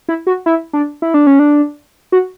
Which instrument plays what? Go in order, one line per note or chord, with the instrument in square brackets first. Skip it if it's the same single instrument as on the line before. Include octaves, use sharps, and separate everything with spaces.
[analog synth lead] E4
F#4
E4
D4
E4
D4
C#4
D4
F#4